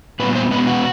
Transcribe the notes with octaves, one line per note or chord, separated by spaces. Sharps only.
A#2 G3 B3 B4
C5
B2 G#3 B3 B4
F#4